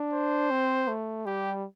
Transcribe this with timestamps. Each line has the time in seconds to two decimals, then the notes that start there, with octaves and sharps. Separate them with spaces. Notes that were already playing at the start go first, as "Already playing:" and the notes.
Already playing: D4
0.13 C5
0.51 C4
0.88 A3
1.26 G3 G4